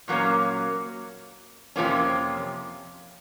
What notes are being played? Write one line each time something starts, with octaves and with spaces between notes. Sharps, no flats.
A#2 F#3 A#3 C#4
F2 C3 F3 A#3 C#4